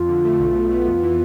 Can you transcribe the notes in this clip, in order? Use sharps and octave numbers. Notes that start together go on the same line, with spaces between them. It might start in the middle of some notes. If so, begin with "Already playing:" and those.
Already playing: F2 F4
D3
A3
B1
B2
B3
F2
E3